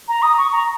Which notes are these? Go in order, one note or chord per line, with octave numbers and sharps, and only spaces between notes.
A#5
D#6
C#6
A#5